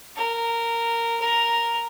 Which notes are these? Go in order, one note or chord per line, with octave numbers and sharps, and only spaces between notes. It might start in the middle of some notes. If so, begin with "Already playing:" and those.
A#4
A#4